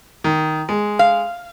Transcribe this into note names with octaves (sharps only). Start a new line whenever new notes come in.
D#3
G#3
F5